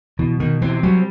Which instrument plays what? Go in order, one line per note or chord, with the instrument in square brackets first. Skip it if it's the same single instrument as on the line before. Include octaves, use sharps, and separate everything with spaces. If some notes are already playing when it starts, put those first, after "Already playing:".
[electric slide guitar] B2 [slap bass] E3
[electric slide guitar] B2 [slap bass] D#3
[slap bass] E3 [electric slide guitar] C4
[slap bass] F#3 [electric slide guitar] G3